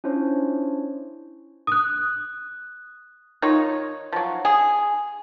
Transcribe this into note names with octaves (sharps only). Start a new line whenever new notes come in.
C#4 D4 E4 F4 C5 C#5
D#6 F#6
D#3 D#4 F4 C#5
F3 F#3
G#4